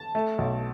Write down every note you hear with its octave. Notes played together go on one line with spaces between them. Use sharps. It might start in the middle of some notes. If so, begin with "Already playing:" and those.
Already playing: A5
A3
B1